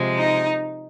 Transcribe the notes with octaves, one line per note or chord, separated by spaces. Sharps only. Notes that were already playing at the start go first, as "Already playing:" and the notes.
Already playing: C3 F3 G#3
D#4